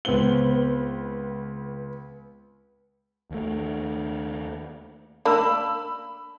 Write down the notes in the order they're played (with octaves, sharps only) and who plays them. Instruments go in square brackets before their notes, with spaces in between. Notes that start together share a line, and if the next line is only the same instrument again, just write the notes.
[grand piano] C#2 B3 C4 G7
[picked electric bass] D#2 A3
[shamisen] A#3 D4 [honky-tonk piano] B5 E6